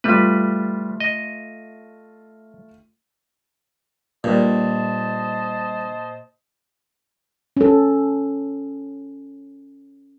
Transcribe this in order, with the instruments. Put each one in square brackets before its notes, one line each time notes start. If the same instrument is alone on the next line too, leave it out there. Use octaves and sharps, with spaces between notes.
[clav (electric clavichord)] G3 B4 [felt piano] A3 F4
[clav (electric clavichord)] D#5
[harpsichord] G2 [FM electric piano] A#2 [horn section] C5 D#5 A5
[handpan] C#4 A4